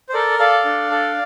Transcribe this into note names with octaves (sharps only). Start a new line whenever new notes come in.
C5
A4 A#4 D5
A4 D5 F5
D4
A4